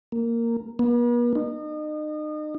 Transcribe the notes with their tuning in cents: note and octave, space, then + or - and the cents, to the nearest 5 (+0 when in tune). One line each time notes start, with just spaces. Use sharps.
A#3 -10
B3 -45
D#4 -35